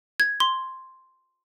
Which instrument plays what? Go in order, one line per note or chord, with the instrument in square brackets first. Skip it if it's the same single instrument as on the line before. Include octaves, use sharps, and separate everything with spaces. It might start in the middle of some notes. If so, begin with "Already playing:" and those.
[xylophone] G#6
C6